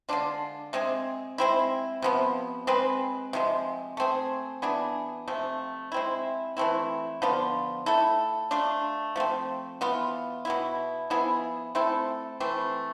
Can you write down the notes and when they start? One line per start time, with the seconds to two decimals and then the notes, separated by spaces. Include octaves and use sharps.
0.09 D3 G#3 D4 F4
0.73 C3 G#3 C4 G#4
1.38 G#3 C4 E4
2.02 C3 F3 B3
2.67 G#3 C4 G#4 B4
3.33 C3 F3 G#3
3.97 A3 C4 G#4
4.62 E3 B3 D4 G#4
5.28 C3 F3 A3
5.92 G#3 C4 E4
6.57 E3 A3 C4 E4
7.22 D3 F3 B3 F4
7.86 A3 E4 A4
8.51 A3 D4 F4
9.16 F3 A3 C4
9.81 E3 B3 F4
10.45 B2 B3 E4
11.10 F3 B3 E4 G#4
11.75 A3 C4 E4 A4
12.40 E3 A3 C4